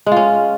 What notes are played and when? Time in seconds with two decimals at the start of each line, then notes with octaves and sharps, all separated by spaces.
0.06 G#3
0.11 F4
0.16 C#4